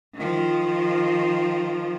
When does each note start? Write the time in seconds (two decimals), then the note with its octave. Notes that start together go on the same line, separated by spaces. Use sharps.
0.16 D#3 F3